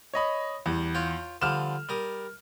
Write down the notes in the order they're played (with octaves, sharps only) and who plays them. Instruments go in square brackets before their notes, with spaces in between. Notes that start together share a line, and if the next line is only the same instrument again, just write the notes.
[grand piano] C#5 D#5 B5
[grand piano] E2 [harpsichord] G3
[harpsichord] F4 C#5 G5
[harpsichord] D3 F3 G3 [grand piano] F6 E7
[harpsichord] G3 A#4 D#6